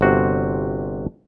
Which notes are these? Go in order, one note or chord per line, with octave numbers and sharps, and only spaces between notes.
G1 C3 F#4 C5